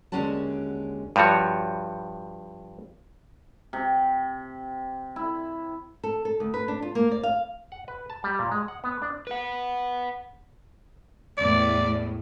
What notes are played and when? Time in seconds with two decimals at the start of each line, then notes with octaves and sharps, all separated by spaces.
0.12 D#2 D3 G#3 C#4 F#4 A5
1.16 G2 F3 G3 F#4 C#5
3.73 C3
5.16 E4
6.04 A4
6.25 A4
6.40 D2
6.54 B4
6.68 D4
6.82 F4
6.95 A#3
7.11 D5
7.23 F5
7.72 F#5
7.88 B4
8.10 A5
8.24 G3
8.39 A#2
8.51 G#3
8.68 F#5
8.84 B3
9.02 D4
9.27 B4 F#5
11.38 E2 A2 D5